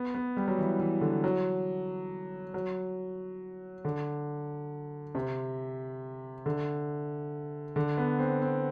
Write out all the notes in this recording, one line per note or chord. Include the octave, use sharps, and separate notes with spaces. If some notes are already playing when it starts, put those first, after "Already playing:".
Already playing: B3
B3
G3
F#3
E3
E3
D3
F#3
F#3
D3
C3
D3
D3
B3
C4
C4